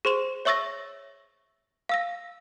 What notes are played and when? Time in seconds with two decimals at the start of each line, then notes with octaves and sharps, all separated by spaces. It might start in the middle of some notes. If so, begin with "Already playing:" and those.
0.05 G#4 C5 C6 E7
0.45 C#5 E5 C#6 E6 A6 A#6
1.89 F5 E6 A#6